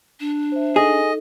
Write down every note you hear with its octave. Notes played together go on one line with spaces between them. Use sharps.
D4
C5 E5
D#4 G#4 A4 D#5